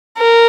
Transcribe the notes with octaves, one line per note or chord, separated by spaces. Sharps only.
A#4